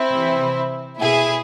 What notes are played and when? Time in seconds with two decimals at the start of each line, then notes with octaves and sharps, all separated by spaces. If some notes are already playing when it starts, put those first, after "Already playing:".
Already playing: C4 E4
0.11 C3 E3
0.99 B2 E4 G#4